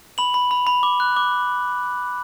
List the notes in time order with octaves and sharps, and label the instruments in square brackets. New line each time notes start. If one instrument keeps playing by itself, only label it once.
[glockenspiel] B5 F#7
B5
B5
B5
D6
F#6
D6